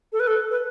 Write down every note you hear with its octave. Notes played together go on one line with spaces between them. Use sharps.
A4
B4
A4
B4